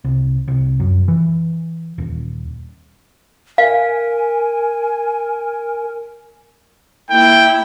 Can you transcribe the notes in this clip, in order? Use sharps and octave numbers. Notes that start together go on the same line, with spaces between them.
C2
C2
F#2
E3
D#1
A#4 F5 G#5
A#3 E4 G5